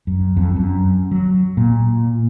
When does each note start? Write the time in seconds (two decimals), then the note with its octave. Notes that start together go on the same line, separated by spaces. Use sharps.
0.07 F#2
0.37 F2
0.56 F#2
1.11 F#3
1.57 A#2